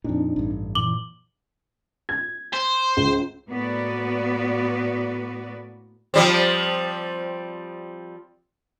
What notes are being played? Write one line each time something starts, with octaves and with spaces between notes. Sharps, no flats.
F2 A#2 C4 D4 D#4
A1 G2
F#2 A#2 E3 D6 F#7 G7
G#6
C5
C#2
A2 A#3 B3 F#4 B4 D5
F3 G3 C4